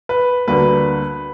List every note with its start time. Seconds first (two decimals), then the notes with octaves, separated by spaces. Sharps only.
0.09 B4
0.48 D2 D3 G3 A#3 B4